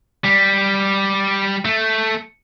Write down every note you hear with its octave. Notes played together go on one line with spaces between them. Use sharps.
G3
A3